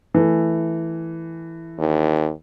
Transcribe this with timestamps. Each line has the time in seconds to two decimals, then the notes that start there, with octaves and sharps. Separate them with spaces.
0.14 E3 A3
1.78 D#2